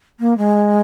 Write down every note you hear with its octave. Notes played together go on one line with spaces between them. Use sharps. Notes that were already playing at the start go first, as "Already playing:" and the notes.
A#3
G#3